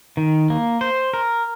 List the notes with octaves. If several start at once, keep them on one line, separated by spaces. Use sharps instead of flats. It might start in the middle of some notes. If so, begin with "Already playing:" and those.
D#3
A#3
C5
A#4